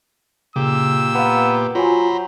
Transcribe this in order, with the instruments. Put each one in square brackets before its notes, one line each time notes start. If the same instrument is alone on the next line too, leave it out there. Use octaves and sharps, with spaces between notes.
[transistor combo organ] A#2 G4 [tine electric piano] C#3 [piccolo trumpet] E6
[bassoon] B3 [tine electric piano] F5 A#5
[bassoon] F#3 [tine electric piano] F4 F#4 G#5 [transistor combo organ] C5 A#5 B5